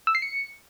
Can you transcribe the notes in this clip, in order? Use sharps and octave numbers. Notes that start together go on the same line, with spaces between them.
E6
C7
C#7